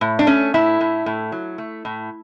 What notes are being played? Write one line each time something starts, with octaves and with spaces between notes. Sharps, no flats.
A2
D4
A3 C#4
A2 E4
A2
A2
F#3
A3
A2